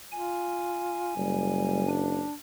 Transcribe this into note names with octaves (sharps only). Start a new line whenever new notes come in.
F4 G#5
F#1 G3
D4